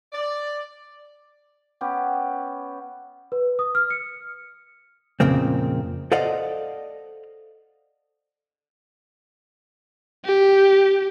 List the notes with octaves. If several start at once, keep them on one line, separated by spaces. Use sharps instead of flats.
D5
B3 C#4 G4
B4
D#6
F6
C#7
F2 A#2 C#3 A#3 C4
A4 C5 D5 D#5 F5 F#5
G4